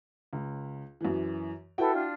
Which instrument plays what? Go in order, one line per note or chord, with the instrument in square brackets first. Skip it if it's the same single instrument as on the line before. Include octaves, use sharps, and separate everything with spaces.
[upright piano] C#2
F#2 E3
[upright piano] E4 F#4 G5 [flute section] A4 B4
[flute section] D4 F4